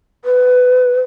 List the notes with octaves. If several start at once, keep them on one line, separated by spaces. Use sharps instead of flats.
B4